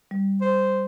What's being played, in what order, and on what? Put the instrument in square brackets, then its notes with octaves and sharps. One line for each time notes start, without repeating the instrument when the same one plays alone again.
[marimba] G3
[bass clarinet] C5